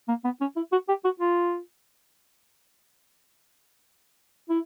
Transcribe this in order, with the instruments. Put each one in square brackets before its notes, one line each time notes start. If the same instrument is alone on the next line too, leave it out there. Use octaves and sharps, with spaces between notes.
[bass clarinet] A#3
B3
C#4
E4
F#4
G4
F#4
F4
E4